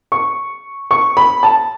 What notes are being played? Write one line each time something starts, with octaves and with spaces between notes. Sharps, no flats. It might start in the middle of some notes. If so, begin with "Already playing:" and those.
C#6
C#6
B5
A5